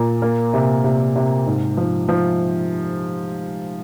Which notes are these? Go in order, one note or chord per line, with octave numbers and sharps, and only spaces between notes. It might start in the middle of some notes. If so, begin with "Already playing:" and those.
Already playing: A#2
A#3
C3
C3
C3
G#2
F3
F3